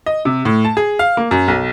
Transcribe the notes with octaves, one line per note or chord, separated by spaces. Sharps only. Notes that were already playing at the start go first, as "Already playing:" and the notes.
D#5
C3
A2
A5
G#4
F5
A#3
F#2
B1